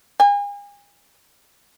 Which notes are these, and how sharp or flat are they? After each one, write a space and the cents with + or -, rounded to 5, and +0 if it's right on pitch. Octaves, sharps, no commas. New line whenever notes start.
G#5 -40